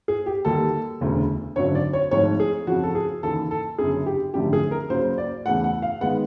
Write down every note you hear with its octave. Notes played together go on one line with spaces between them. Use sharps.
G#4
G4
D#2 D#3 G3 A#3 A4
E1 D2 C#3 E3 A3
G#1 F#2 D3 F#3 C#5
D5
C#5
G#1 G#2 F3 A3 C#5
G#4
F2 C#3 F3 F#4
A4
G#4
D#2 C#3 E3 A4
A4
G1 F#2 C#3 G#4
G4
G#1 F#2 D3 F3 A3 G4
G#4
A#4
C#2 C#3 F#3 A#3 C5
D5
E2 C#3 E3 A3 F#5
F#5
F5
D#3 G#3 B3 F#5